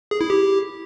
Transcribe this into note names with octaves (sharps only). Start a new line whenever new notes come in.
G#4
E4
G4